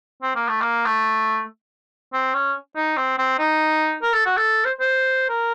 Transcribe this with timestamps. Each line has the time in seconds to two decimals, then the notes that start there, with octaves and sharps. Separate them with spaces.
0.22 C4
0.36 A#3
0.49 A3
0.61 A#3
0.86 A3
2.13 C4
2.34 C#4
2.76 D#4
2.97 C4
3.18 C4
3.39 D#4
4.02 A#4
4.13 A4
4.26 F#4
4.37 A4
4.65 C5
4.80 C5
5.29 A#4